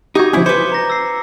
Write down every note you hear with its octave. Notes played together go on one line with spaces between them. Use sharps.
D#4 F#4 G4 D6 G6 G#6
C#2 B2 F3 C#4 E4
B4 C5 D6 C#7
A#5 A#6
E6 C7